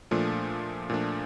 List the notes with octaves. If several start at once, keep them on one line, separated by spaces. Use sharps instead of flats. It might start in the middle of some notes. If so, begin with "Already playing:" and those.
A#2 F3 A3 D4
A#2 F3 A3 D4